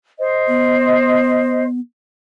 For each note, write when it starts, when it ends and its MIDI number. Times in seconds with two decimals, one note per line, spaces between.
0.18 1.63 72
0.18 1.63 75
0.48 1.80 59